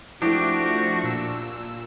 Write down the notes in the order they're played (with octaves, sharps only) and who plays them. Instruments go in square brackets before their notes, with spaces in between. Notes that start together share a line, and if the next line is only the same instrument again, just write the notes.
[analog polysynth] F3 A3 [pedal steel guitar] D4 G4 [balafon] E4 [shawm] F#4
[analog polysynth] A#2 E6